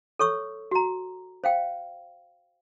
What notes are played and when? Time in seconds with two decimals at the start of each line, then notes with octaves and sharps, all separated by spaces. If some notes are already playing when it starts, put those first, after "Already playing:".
0.19 A4 C#5 C#6 E6
0.71 F#4 A#5
1.44 C5 F5 G5